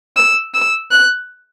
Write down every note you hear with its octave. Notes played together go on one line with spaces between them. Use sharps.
E6
E6
F#6